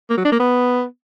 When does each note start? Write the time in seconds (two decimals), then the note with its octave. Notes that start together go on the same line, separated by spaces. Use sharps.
0.10 A#3
0.18 F#3
0.25 D4
0.32 A#3
0.40 B3